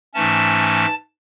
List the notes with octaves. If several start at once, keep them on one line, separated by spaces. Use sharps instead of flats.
G#2 E3 A3 C#4 A5